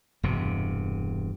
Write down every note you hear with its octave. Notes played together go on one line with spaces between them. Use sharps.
E1 G2 C3